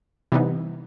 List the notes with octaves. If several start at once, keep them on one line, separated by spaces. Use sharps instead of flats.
C3 E3 G3 B3 D#4